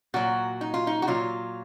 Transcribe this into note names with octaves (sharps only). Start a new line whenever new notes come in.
A#2 F#3 F#4
D#4
F4
D#4
F#4
A#2 F#3 F4